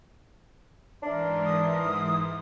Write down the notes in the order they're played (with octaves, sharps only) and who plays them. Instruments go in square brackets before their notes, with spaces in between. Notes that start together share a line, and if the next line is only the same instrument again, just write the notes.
[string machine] G#2 E3 [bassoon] D4 [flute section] A#4 E5 C6
[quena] D#6